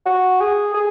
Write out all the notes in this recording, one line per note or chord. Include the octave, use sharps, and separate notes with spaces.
F#4
G#4
G#4